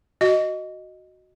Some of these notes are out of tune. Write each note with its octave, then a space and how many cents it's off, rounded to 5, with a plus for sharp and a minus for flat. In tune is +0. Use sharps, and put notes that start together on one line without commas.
F#4 +0 D#5 +0